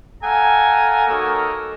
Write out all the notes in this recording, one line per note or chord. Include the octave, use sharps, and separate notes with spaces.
A4 F5 F#5 G#5 A#5
A#3 D#4 F#4 A4 A#4 C#5